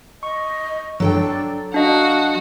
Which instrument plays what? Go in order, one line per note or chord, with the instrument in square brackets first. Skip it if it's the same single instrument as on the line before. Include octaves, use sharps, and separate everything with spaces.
[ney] D#5 [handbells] C#6
[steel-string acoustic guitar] F#3 A4 G5 [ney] D4
[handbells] D4 D#5 [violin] F#4 [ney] F5